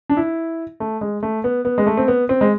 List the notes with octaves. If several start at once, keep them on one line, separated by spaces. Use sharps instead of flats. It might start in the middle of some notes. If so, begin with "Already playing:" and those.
D4
E4
A3
G#3
A3
B3
B3
G#3
A3
C4
B3
C4
G#3